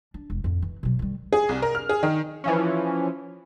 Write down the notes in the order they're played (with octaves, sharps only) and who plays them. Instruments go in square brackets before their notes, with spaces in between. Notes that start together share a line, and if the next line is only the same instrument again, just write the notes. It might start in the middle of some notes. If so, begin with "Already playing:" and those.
[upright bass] D4
E1
F2 A2
E3
B2 F#3
D#3 G3
[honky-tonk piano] G#4
C2
A#4
F6
G#4
D#3
[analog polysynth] E3 F3 C#4